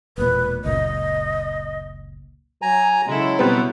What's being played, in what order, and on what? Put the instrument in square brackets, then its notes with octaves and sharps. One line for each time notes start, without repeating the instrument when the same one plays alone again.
[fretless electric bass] E1 A#2 [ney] B4
[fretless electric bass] F#1 C#2 A#2 [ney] D#5
[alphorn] F#3 [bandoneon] G#5 A#5
[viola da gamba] C#3 E4 A4 [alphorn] F#3 [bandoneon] G#3
[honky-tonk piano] B2 G3 C4 [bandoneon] B4